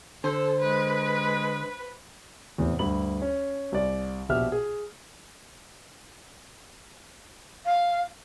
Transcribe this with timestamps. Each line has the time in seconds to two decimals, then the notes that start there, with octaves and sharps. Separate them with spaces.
0.24 D3 A4 C5
0.60 G#3 B4
2.58 E2 A2 C3
2.79 D2 G2 B5 F#7
3.22 C#4
3.72 C2 D5
4.29 A#1 B2 G4 E5 F6
4.52 G#4
7.65 F5